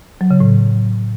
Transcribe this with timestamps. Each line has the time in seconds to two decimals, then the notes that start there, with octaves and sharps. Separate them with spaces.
0.21 F#3
0.31 C#3
0.40 A2